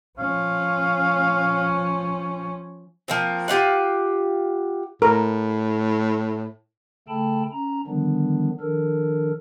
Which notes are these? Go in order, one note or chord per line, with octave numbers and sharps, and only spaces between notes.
F3 C#4 F5
F3 A#3 C4
F4 G4 F5 F#5
A2 A#4
C#3 A3 A4 G5 A5 B5
C#4 A#5
D3 D#3 F3 G3 B3 D4
D#3 F3 D4 A4 A#4